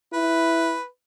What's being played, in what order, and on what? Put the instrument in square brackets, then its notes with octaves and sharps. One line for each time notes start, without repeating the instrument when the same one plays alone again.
[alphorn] E4 [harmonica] B4